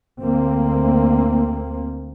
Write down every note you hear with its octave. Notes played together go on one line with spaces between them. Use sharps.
D2 A#3 C4